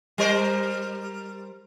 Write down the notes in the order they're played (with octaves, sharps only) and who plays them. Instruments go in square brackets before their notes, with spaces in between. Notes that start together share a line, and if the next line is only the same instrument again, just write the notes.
[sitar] G3 A#4 C5